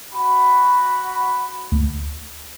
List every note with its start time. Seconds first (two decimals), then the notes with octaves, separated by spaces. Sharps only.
0.13 F#4 B5
1.72 D2